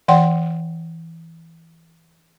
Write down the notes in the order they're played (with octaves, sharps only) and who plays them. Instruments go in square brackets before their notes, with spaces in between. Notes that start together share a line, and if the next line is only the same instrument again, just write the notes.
[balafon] E3 D5 F#5 G5 C6